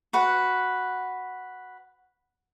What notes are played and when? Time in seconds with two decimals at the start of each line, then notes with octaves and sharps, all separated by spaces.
0.13 F#4 B4 F#5